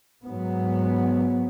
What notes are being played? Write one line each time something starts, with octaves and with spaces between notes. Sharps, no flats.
G#2 F#3 B3